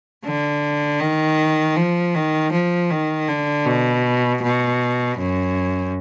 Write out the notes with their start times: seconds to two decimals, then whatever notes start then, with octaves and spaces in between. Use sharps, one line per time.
0.25 D3
1.00 D#3
1.76 F3
2.15 D#3
2.52 F3
2.90 D#3
3.28 D3
3.66 B2
4.42 B2
5.18 F#2